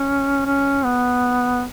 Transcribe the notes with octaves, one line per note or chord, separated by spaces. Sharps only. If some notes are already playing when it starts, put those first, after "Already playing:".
Already playing: C#4
C#4
B3